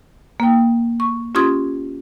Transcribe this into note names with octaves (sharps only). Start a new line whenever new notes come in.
A#3 G5
C#6
C#4 F4 G4 C6 D#6 G#6